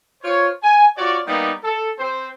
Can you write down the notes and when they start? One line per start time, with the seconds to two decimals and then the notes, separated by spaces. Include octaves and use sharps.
0.23 F4 C5 C#5
0.63 G#5
0.97 F4 F#4 C#5 D5
1.26 G3 A#3 B3 D#4 D5
1.63 A4
1.99 C4 C5